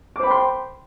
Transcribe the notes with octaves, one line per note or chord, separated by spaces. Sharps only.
C5 G5 B5 C6 D6